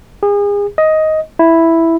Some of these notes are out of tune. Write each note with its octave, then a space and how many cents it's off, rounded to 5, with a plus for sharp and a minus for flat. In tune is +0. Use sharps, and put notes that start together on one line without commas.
G#4 -35
D#5 +10
E4 +0